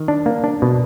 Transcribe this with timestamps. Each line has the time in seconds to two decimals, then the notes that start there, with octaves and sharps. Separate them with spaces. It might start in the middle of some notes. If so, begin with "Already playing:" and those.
Already playing: D#3
0.08 D4
0.26 A#3
0.44 D4
0.62 B2